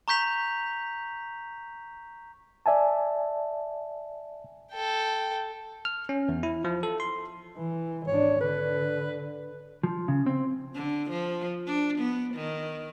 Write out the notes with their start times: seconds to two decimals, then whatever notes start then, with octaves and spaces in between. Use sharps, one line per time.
0.08 A#5 C#6 G6 B6 F7
2.66 D5 E5 G#5 A5
4.72 A4 G5
5.85 F6
6.09 C#4
6.29 E2
6.43 E4
6.65 F3
6.83 A4
7.00 C6
7.57 E3
8.08 G#1 D4 C#5
8.41 D3 B4
9.84 F3
10.08 C#3
10.26 C4
10.75 D3
11.10 F3
11.67 D4
11.99 B3
12.34 D#3